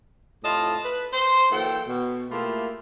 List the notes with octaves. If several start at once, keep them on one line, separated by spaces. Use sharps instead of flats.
A2 C3 E4 F4 D#5 A5
B4
C5
E3 F#3 A#3 A4 G5
B2
A3 A#3 E4 F4 G4 G#4